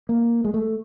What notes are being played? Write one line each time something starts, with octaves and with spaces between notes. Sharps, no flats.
A#3
G#3
A3